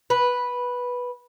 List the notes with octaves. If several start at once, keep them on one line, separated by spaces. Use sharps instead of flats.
B4